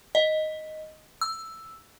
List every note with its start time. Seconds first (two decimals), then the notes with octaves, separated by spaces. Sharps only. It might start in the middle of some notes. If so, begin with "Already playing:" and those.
0.15 D#5
1.21 E6